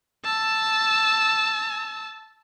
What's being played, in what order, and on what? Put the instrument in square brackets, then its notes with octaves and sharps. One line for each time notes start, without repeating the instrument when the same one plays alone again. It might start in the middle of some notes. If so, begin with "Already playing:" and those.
[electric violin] A5 E6